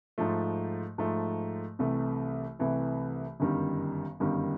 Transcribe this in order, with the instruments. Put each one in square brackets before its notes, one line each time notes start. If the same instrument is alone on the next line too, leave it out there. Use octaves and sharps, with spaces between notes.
[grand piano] G#2 F3 A3
G#2 F3 A3
C2 C3 E3 A3
C2 C3 E3 A3
G1 F#2 D#3 G3
G1 F#2 D#3 G3